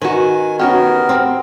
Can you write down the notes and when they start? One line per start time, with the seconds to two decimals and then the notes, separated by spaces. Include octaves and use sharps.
0.02 D#3 F#4 B4 G#5
0.59 B3 C#4 F#4 G4 A#4
1.09 C4